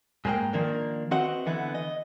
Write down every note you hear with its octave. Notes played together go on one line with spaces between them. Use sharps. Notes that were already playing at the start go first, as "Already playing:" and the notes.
G#2 G#3 A#3 B4 G5
D#3 F3 A#3 D4 A#4
C4 F#4 B4 D#5 E5 F#5
D3 E3 B3 E4
D#5